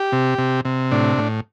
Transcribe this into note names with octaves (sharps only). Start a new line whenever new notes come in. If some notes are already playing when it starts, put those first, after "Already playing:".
Already playing: G4
C3
C3
C3
A2 D4
A2